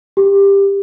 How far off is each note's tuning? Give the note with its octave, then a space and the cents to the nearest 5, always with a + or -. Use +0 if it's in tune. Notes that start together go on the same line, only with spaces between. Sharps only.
G4 +15